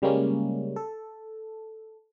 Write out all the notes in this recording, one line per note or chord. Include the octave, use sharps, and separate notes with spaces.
C#3 G3 G#3 A#3 C#4
A4